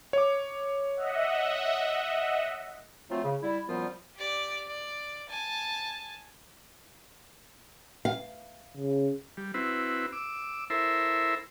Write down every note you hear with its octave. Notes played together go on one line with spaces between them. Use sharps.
C#5 D6
D#5 E5 F#5
F3 F#3 A3 C4 F4
C#3
G3 E4
F#2 A#2 F3 G3 B3 F4
G4 D5
D5
G#5 A5
F5
C#3
G3
C4 E4 F#4 B4
D6 E6
E4 A4 A#4 C5 E5 B5